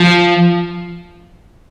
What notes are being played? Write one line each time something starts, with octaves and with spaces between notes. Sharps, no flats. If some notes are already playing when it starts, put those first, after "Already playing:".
Already playing: F3